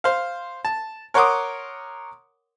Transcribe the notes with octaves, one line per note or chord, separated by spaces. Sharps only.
C5 F5
A5
A#4 C#5 F#5 C6 D6 D#6